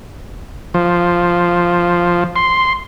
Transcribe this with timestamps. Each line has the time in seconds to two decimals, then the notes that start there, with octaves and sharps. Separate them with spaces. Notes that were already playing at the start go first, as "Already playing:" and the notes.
0.74 F3
2.36 C6